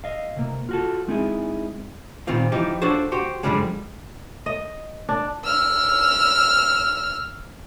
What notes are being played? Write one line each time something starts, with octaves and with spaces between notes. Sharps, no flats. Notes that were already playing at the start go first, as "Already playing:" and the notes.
D#5 F5
C3 A#3
F4 F#4 A4
G#3 C4 D#4 E4 F#4 G#4
A#2 D#3 G3 C4 F4
E3 F3 D#4 G4
D4 F4 F#4 A4 C5 C#5
F#4 G4 C5
F#2 B2 D3 F3 G3 G#3
D#5
D4
E6 F6